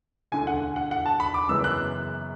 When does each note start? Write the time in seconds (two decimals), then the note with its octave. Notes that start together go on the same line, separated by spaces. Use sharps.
0.32 E1 D2 D3 G#5
0.47 F#5
0.76 F#5
0.91 F#5
1.06 A5
1.20 B5
1.34 D6
1.49 F#1 F#2 E3 G#3 B3 E6
1.64 F#6